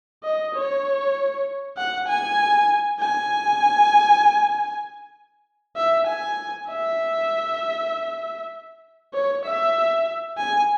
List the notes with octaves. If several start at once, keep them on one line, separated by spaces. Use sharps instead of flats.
D#5
C#5
F#5
G#5
G#5
E5
G#5
E5
C#5
E5
G#5